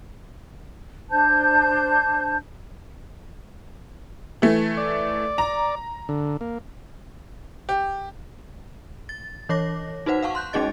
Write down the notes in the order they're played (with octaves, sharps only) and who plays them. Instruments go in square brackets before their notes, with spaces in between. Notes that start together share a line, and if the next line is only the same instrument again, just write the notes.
[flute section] D4 C5 A5 G6
[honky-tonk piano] E3 A3
[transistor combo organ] D5
[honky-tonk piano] A#5
[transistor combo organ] D3
A#3
[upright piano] G4
[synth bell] A6
E3 C#5 D6 A#6
D#4 F#4 B4 C5 F#5
F5 F#5 A5 C#6
C6 F#6 G6
G#3 C#4 D#4 G#4 D#5 A6